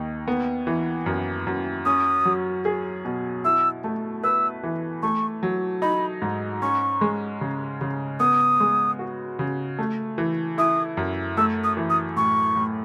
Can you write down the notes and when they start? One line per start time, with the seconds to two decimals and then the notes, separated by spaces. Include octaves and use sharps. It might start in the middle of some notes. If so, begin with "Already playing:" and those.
Already playing: D#2 D#4
0.28 B3
0.67 E3
1.06 F#2
1.47 F#2
1.85 C#4 D#6
2.25 F#3
2.65 G#4
3.05 B2
3.44 E4 E6
3.84 A3
4.24 B4 E6
4.63 E3
5.02 A3 C#6
5.43 F#3
5.82 D#4 B5
6.22 G#2
6.62 C#4 C#6
7.01 G#3
7.41 C#3
7.81 C#3
8.20 B3 D#6
8.60 G#3
8.99 F#4
9.39 C#3
9.79 A3
10.18 E3
10.58 E4 D#6
10.97 F#2
11.37 A3 E6
11.64 D#6
11.77 E3
11.90 D#6
12.17 A2 C#6
12.56 A2